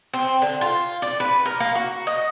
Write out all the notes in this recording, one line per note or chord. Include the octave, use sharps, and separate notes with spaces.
C4
D3
F4
D5
B4
A#4
A#3
F#4
D#5